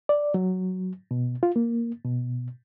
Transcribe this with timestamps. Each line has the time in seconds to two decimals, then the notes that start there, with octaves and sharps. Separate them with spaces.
0.09 D5
0.34 F#3
1.11 B2
1.43 F4
1.56 A#3
2.05 B2